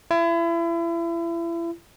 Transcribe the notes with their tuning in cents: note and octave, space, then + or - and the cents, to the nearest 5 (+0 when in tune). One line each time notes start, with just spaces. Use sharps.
E4 +35